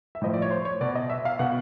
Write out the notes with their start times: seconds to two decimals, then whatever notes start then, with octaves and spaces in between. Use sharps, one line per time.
0.15 E5
0.22 A2 F3 D#5
0.34 D5
0.42 C#5
0.51 C5
0.65 C#5
0.81 B2 D5
0.95 D#5
1.10 E5
1.25 F5
1.39 B2 F#5